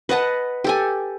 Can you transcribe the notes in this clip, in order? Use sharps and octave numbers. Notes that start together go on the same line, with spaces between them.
B4 D#5 F#5 A5
G4 A4 G#5